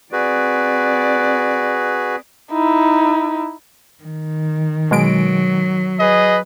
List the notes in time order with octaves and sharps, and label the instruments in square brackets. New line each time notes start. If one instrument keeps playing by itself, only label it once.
[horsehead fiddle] C4 D5 [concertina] F#4 G#4 B4
[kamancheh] D#4 E4
[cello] D#3
[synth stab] B2 G#3 D7 [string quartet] F#3
[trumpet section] G#4 B4 D#5